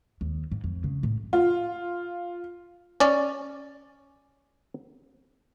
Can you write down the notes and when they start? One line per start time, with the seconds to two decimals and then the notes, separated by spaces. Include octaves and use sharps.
0.21 D#2
0.52 G#2
0.64 F2
0.84 C#3
1.03 A2
1.33 F4
3.00 C#4 D5